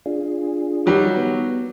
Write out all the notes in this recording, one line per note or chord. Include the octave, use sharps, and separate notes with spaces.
D4 F4 G#4
D#3 F#3 G3
B3